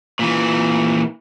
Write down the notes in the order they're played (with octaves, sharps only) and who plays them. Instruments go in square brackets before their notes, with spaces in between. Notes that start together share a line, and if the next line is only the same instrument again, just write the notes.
[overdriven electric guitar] A#2 E3